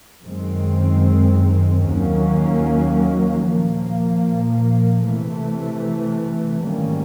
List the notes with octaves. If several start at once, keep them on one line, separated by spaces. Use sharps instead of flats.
F#2 D#3 G#3 C4
D#2 D#3 F#3 A#3 C#4
A#2 F3 A#3
C3 E3 A3
G#2 D#3 G3 A#3 C#4